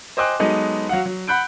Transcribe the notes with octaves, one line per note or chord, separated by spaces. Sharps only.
C5 D#5 G5 G#5 D6 F#6
F#3 G#3 B3 D#4 A4 B4
F#3 F5 F#5
F#3
F#5 B5 F#6 G6 D7